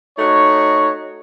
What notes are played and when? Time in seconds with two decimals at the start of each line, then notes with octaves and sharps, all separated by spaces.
0.18 A3 D#4 F#4 C#5